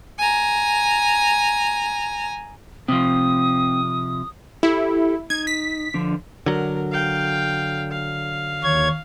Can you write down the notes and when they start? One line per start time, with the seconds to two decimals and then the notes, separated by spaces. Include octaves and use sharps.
0.19 G#5 A#5
2.88 C3 F3 C4 D#6
4.63 E4 G4 A4
5.30 D#4 G#6
5.47 B6
5.94 D3 F3 D4
6.46 D3 F#3 A#4
6.92 F5 G5
7.91 F5
8.64 D#2 C#5 G#6